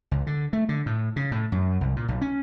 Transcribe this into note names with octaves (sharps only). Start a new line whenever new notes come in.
C#2
D3
A3
D3
A2
C#3
A2
F#2
C2
A#2
B1
C#4